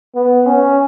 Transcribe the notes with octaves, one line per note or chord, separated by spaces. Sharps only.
B3
C#4